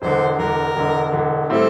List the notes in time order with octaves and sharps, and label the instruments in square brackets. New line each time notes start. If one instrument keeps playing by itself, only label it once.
[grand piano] E1 E2 D3 [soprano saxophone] C5
[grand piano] E1 E2 D3 [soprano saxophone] A#4
[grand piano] E1 E2 D3
E1 E2 D3
[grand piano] A2 G3 C4 E4 [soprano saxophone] A4